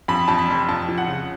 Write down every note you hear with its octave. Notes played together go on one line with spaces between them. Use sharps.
F2 B5
F2 A5
B5
F1
F2 A5
F3
F#5
C#3